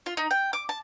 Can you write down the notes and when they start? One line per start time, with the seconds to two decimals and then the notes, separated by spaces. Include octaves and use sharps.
0.06 F4
0.17 D#4
0.31 G5
0.53 D6
0.69 A5